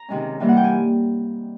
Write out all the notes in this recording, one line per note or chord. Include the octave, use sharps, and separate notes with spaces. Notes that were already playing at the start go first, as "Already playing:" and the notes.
Already playing: A#5
C3 D#3 G#3 C#4
C3 E3 G3 A#3
F#5
G5
G#5